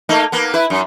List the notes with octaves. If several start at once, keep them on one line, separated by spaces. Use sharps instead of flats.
A3 A#3 D#4
A#3 B3
E4 B4
F#2